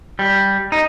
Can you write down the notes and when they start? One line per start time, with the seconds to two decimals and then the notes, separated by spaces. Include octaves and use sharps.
0.19 G3
0.72 D#4